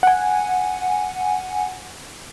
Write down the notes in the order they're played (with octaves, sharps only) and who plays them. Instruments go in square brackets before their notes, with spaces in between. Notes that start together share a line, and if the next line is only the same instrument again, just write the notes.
[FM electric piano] F#5 G#5